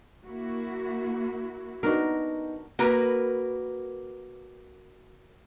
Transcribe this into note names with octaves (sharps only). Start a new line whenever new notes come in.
A#3 E4 F#4
B3 D4 D#4 F#4 A#4
A#3 F#4 A#4 B4